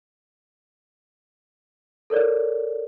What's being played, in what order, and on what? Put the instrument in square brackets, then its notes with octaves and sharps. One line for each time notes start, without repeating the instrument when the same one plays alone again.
[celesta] A4 A#4 C#5 D5